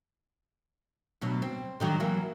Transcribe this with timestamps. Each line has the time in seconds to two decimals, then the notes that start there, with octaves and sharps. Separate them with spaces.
1.21 D2 B2 F#3
1.42 C4
1.80 D3 D#3 F#3
2.00 E3 F#3 A#3